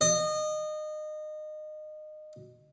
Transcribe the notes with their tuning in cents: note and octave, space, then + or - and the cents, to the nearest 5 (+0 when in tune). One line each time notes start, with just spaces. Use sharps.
D#5 -25